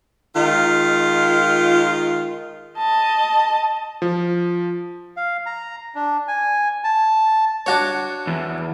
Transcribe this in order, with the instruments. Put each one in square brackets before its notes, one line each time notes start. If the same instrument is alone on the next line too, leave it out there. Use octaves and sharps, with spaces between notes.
[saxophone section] D#3 G#3 F4
[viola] D#5 A5
[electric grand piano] F3
[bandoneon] F5
A#5
D4
G#5
A5
[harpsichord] D4 F#4 C#5
[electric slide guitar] E2